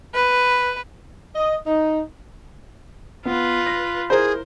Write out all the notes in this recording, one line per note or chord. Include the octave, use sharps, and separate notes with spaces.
B4
D#5
D#4
B3 F4 B4
A#6
E4 G#4 A#4 C5